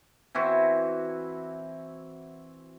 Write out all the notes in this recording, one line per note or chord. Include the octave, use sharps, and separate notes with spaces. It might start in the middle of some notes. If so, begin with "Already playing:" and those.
E3 C4 E4 F#4